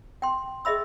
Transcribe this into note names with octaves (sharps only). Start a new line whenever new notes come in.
G5 C6
G#4 D#5 E5 B5 E6